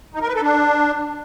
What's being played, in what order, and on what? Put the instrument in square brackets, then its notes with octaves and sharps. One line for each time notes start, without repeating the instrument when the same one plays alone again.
[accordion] D#4
A#4
B4
A4
D4